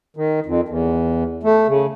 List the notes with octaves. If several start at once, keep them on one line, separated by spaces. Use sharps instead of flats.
D#3
F2
E2
A3
C#3